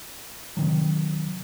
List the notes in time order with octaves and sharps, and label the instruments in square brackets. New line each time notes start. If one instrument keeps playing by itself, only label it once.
[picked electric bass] C3 D#3 F#3